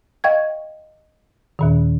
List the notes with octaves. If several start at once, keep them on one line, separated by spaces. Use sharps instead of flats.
D#5 F5 G5 C#6 G#6
D#2 A#2 D#3